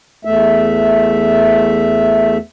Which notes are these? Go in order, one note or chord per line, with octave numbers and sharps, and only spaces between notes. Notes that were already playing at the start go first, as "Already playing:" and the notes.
E2 A3 E5